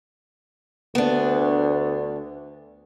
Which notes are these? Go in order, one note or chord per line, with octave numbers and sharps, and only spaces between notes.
D2 B3 D4